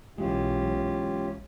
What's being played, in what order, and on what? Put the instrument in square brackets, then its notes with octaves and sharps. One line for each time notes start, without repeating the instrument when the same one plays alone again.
[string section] B1 [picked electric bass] B2 E3 G#3 [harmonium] C#4 F4 G4